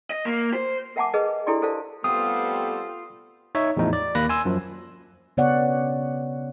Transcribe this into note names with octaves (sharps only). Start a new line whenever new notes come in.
D#5
A#3
C5
A#4 E5 F#5 G#5 A5 D6
G#4 A#4 B4 D#5
D4 E4 G4 A4 D5 C6
A4 A#4 C5 D5 F5 A5
G3 A3 B3 C4 F4 G4 A4 D#6
D#4 C#5 E5
E2 A2 F3 D#4
D5
D#2 A#3 B5 F#6 A#6
G#5 C6 E6
F#2 F3
C#3 B3 C#5 D5 F#5